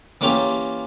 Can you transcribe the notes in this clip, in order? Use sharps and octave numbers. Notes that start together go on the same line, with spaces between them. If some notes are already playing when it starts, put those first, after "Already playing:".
E3 A#3 C#4 F4 G4